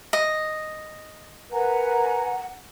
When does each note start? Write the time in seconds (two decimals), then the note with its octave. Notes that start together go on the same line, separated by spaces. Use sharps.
0.13 D#5
1.52 A#4 B4 F#5 G#5 A#5